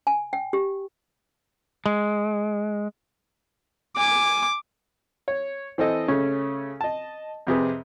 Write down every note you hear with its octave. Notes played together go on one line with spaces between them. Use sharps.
G#5
G5
G4
G#3
G#5 D6
C#5
E3 C4 A4 D#5
C#3 A3 C#4
D#5 A5
F2 C3 G#4 B4